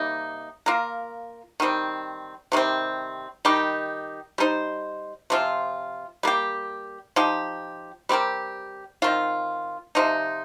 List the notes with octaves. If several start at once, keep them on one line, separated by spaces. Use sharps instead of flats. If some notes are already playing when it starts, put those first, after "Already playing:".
Already playing: C3 G3 A#3 D#4
A#3 F4 A#4
D#3 G3 C4
C3 D#3 G3 C4
D#3 G3 D#4 G4
G3 D#4 C5
C3 F3 C4 F4
G3 A#3 G4
F3 D#4 G4
G3 C4 G4 A#4
D#3 C4 F4
C3 F3 D#4